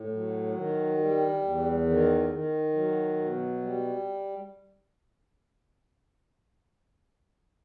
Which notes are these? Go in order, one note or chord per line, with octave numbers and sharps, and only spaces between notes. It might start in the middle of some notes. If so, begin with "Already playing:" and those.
Already playing: A2
F#3
D#3
G3
E2
D#3
D#3
F#3
B2
G3